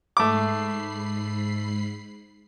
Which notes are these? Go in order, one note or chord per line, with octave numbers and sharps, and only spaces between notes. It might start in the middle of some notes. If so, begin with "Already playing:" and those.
G#2 A3 B5 D6 C7